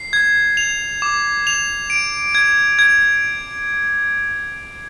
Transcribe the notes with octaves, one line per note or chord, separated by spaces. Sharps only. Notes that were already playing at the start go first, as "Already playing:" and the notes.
Already playing: C7
G#6
F7
D6
F7
D7
G#6
G#6